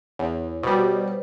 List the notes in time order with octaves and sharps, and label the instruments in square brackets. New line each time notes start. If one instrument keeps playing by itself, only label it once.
[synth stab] E2 [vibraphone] C#5
[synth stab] B2 G3 [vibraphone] C5
[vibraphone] B4